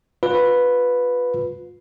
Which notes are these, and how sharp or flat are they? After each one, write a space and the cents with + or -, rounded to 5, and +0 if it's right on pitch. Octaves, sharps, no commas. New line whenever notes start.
F4 +35 B4 +0